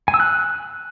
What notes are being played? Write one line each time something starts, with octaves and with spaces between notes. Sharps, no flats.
G#5
E6
F#6